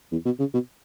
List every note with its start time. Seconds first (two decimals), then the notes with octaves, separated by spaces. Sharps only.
0.12 E2
0.26 B2
0.40 C#3
0.54 B2